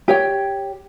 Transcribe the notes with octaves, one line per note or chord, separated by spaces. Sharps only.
G4 C#5 G5